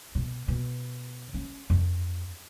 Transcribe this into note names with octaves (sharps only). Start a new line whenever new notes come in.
B2
B2
C#4
F2